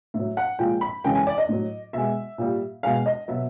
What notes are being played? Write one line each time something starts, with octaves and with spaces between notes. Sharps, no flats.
A2 E5
F#3
F#5
A#2 F3 G#3 G5
B5
F#2 C#3 E3 G#3 G5
G#5
D5
D#5
A2 F#3
B2 G#3 E5
A#2 G3
B2 G#3 F5
D#5
B2 F#3 E5